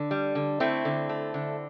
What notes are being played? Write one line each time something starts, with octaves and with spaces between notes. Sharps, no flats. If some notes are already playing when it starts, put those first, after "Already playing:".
Already playing: D3
G3
D3
A3 C4 E4
D3
A3
D3